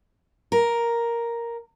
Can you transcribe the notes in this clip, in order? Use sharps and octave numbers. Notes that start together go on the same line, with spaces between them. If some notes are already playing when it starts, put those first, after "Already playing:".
A#4